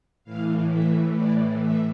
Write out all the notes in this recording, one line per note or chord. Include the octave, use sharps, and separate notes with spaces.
A2 E3 F5
E5
D5
E5